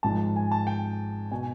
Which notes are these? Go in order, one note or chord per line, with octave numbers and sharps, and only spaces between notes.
G#1 G#2 F3 A5
G#5
A5
G5
B2 G#5